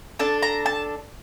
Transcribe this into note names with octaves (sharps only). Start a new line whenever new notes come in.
D4 A4 A5
A#5
A5